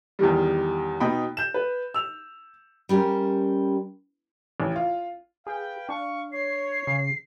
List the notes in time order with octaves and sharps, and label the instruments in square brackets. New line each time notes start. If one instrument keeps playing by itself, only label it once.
[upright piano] E2 D#3 G3
B2 D#4 G5 B5
G6 E7
B4
E6 F7
[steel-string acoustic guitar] G3 C#4 G4 A#4 C5
[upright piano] A1
F4
[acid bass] G#4 [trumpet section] B4 F5 G5
[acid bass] D4 [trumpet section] F5 C#6
[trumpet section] C#5 [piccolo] C7
[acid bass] C#3